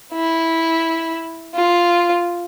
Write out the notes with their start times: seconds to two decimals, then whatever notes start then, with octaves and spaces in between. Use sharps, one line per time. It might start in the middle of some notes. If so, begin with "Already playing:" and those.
0.13 E4
1.55 F4